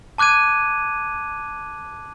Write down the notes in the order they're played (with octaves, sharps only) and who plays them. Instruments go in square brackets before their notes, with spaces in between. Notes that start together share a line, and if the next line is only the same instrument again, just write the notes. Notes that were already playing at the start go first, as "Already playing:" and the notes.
[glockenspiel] A5 D6 F#6 G#6 D#7